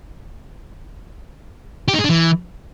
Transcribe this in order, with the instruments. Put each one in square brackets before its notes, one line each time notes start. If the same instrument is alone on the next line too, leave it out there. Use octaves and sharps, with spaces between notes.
[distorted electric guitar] G4
D#4
G#4
D4
E3